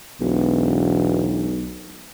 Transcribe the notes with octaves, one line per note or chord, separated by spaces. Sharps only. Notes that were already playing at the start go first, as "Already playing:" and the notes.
E1 B1